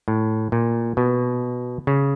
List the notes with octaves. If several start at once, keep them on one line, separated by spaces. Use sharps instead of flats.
A2
A#2
B2
C#3